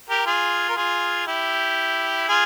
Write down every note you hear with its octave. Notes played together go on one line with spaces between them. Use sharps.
G4 A#4
F4 G#4
A#4
F4 G#4
E4 G4
F4 G#4